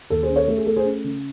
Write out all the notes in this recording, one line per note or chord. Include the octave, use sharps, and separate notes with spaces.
D#2 A4
G#4 C5
C#4
A4 C#5
A3 A4
G#4
A3 A4
G#4 C5
C#4
C#3